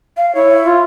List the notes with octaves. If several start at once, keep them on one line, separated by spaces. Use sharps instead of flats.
F5
E4 C#5
F4